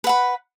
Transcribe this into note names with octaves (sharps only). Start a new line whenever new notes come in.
B4 F#5 B5